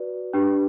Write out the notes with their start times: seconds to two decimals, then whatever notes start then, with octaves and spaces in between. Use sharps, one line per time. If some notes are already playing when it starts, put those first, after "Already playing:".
Already playing: F#4 B4 D5
0.33 D4 G4 B4